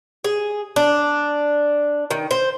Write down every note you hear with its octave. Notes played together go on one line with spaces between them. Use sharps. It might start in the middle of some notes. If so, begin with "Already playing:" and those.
G#4
D4
D#3
C5